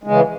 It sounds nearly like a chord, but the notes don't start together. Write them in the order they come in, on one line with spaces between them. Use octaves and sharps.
G#3 C#3 E3